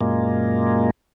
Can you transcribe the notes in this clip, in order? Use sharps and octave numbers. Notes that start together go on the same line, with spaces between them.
F#2 A#2 G#3 A#3